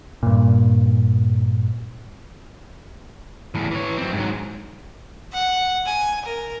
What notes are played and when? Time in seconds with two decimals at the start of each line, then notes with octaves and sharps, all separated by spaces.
0.23 G2 A#2
3.55 E2 A2
3.71 E3 C#5
3.98 F#2 C4
4.13 G#2 F#3
5.33 F#5
5.86 G#5
6.25 A#4